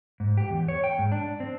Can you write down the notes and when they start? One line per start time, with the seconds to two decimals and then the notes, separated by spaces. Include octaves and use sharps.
0.20 G#2
0.37 G4
0.50 E2
0.68 C#5
0.84 G5
0.99 G#2
1.12 D4
1.40 C4